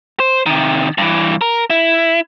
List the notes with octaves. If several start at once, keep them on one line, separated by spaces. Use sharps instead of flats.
C5
C3 D#3
G2 E3
A#4
E4